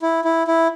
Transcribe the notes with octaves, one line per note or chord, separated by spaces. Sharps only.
E4
E4
E4